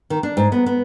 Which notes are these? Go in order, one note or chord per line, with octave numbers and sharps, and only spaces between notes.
D#3
D4
G#2
B3
B3